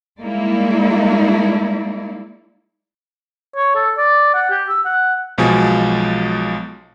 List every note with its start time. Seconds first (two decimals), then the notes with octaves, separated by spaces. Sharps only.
0.22 G3 G#3 A#3 D#4 E4 D5
3.56 C#5
3.76 A4
3.97 D5
4.34 F#5
4.51 G4
4.69 E6
4.85 F#5
5.38 B1 B2 F3 G#3 G#5